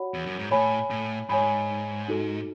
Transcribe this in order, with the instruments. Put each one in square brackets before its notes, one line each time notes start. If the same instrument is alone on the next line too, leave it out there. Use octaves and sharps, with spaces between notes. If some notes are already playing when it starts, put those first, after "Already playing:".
Already playing: [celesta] F#4 C#5 F#5 B5
[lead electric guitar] E2
F#2
G#2
[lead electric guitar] A2 [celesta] C#5 G#5 B5
[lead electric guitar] A2
[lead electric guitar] G#2 [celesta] C#5 G#5 B5
[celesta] D#4 F#4 A4